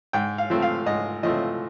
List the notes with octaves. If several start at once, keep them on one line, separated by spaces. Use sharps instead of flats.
G#2 G5
F5
F3 A3 C4
F5
G#2 D#5
F3 A3 C4 D#5